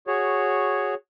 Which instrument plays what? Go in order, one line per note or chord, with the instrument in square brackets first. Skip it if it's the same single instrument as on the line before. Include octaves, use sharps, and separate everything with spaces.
[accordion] F#4 G#4 C#5